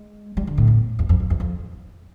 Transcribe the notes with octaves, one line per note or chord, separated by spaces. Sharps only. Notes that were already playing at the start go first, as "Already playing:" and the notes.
Already playing: G#3
G3
D3
A2
E2
E2
F2
F2
E2
F2